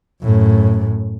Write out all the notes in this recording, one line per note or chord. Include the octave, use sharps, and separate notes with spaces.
F#2 A2